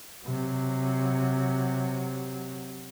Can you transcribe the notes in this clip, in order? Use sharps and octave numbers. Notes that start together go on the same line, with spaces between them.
C3 F#3